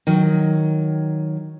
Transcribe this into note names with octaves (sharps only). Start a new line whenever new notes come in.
D#3 F#3